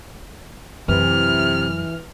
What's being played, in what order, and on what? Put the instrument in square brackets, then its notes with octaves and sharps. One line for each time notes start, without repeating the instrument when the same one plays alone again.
[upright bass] F#2 [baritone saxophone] C3 [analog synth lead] E3 [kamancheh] F6